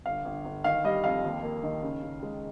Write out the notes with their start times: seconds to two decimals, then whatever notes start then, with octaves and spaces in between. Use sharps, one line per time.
0.06 G1 F5
0.25 G1
0.45 G1
0.64 D#3 F5
0.84 G3 D#5
1.04 F2 F5
1.24 D#2
1.43 A#3
1.63 D#3
1.83 C#3
2.03 C#3
2.23 G#3